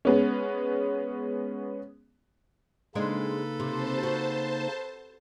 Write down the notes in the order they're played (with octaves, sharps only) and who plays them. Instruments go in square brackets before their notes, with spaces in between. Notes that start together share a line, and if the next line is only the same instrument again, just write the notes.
[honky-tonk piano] G#3 B3 C#4
[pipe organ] C#3 A#3 D#4 [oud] G#3 C4 D4 [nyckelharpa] A4 B4
[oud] C3 [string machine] C5 A5
[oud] F#4